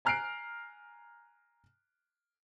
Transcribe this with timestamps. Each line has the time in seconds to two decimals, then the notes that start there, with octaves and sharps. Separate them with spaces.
0.05 G#5 A#5 F6 F#6 C7 D7